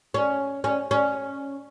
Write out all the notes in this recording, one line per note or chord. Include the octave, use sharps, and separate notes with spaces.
C#4
C#4
C#4